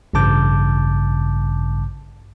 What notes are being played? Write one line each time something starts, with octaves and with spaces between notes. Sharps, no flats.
A1 G2 C#3 A5 D6 G6